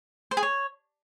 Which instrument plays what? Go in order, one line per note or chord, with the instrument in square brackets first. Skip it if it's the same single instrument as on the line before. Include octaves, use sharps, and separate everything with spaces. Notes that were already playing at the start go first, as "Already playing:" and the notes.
[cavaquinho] C5
G#4
C#5